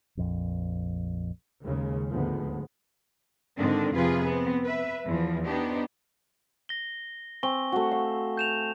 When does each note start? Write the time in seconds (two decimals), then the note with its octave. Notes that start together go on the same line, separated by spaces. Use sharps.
0.17 A#1 F2
1.64 D#2 C#3 G#3
2.10 D2 G#2 F3 G#3 B3
3.58 G#2 D3 D#3 C4 D4
3.95 F2 C3 F3 F4 G#4 B4
4.25 B3 C4
4.63 B4 E5
5.05 E2 E3 F3
5.45 B3 D4 D#4 G4 C5
6.69 A#6 G7
7.43 C4 G#5 C#6 G7
7.72 A3 F#4
7.91 F5
8.37 G6 E7 F7